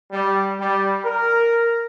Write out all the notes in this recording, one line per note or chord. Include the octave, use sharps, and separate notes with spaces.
G3
G3
A#4